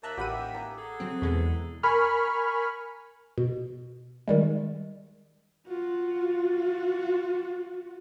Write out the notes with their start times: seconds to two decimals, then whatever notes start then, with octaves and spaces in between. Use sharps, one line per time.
0.03 D#2 A#3 E5 A5 A#5 F#6
0.18 A1 G4 F#5 G5 B5 D#7
0.54 G#5 A#5
0.77 G#4 A4
1.00 C3 F#3 C4
1.22 E2 B2 G#3 B3
1.83 A#4 G#5 B5 C#6 F6
3.38 B2
4.28 D#3 G3 G#3
5.67 F4 F#4